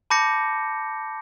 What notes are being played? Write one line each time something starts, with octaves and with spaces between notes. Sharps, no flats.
A5 B5 D6 G6 A#6 C#7